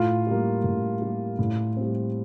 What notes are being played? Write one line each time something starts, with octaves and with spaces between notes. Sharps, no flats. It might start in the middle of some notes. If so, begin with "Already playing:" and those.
Already playing: A2 F4
G3 A#3
A2
G3 A#3
A2
G3 C4